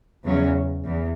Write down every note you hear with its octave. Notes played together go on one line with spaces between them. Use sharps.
E2 C#3 F#3 C#4
E2